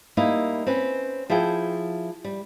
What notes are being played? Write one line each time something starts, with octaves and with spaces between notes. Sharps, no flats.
G3 A#3 D#4 E4
C4 C#4 B4
F3 E4 G#4 E5 G5
G3